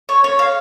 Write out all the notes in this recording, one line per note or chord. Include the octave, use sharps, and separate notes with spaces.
C#5
C#5
F5